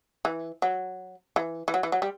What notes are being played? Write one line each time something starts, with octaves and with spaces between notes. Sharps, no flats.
E3
F#3
E3
E3
F#3
E3
F#3
G3